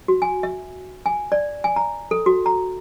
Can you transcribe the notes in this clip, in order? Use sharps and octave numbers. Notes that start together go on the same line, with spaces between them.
F#4
G#5
E5
G#5
D5
G#5
A#5
A4
F#4
A#5